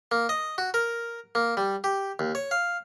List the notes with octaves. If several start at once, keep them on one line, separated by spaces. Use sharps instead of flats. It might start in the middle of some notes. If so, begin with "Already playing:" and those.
A#3
D#5
F#4
A#4
A#3
G3
G4
D#2
C#5
F5